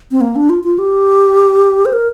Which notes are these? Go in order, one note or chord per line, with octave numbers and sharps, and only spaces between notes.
C4
A#3
D4
F4
F4
G4
C5
A#4